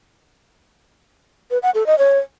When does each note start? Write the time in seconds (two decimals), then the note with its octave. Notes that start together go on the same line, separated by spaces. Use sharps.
1.51 B4
1.63 F#5
1.75 A4
1.87 D#5
1.98 C#5